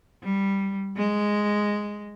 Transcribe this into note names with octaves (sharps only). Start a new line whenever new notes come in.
G3
G#3